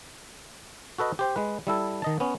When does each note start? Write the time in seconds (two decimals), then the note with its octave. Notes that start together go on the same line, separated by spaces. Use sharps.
0.98 F#4 A4 B4 D#5
1.19 G4 C5 G5
1.36 G#3 B4
1.67 G3 E4 A4
2.02 D#3 D#5 A5
2.20 B3 C#4